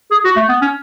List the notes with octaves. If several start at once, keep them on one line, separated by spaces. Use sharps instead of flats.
G#4
F#4
A3
B3
C#4